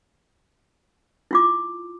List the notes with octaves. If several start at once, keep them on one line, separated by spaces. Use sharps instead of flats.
E4 F4 D6